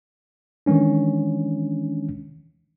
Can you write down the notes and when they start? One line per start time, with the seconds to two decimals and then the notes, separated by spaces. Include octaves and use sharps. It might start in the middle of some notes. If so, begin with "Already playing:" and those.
0.66 D#3 E3 G#3 C#4 D4